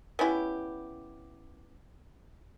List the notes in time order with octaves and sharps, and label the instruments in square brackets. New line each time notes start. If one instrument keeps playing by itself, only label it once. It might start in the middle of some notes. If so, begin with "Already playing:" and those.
[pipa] B3 C#4 E4 G4